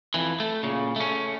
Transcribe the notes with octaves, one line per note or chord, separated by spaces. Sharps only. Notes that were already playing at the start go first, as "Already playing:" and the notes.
F2 E3
A3
A#2 C#3
A3 C#4